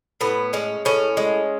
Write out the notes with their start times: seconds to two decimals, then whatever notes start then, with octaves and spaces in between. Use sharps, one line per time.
0.21 A2 B3
0.53 G#3 C#4
0.85 A2 C#4
1.17 G#3